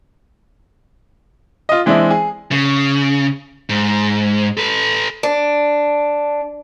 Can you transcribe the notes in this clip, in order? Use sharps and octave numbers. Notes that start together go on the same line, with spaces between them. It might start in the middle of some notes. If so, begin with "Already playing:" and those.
F4 D#5
E3 G#3 C4 D4 E4
G#4
C#3
G#2
A4 B4
D4